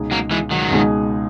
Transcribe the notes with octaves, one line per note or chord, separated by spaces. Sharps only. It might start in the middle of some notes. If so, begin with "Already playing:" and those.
Already playing: C#2 B2 G#3 D#4 G#4
F#3 A#3
E3 G#3
D#3 F#3
C#2 B2 G#3 D#4 G#4